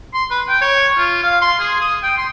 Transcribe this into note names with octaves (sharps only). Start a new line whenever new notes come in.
C6
B4
G5
C#5
F4
F5
C6
G#4
D#6
G5
C6